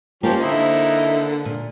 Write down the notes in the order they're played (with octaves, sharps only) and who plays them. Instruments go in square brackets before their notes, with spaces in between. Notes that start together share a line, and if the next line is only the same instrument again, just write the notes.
[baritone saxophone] F3 [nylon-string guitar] A#3 C5 [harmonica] C#4 G4
[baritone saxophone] D3 [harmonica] D#4 E4 E5
[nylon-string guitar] A#2